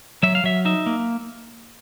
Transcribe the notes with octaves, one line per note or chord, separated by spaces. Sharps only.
F#3 E5
F5
F#3 E5
D#4 E5
A#3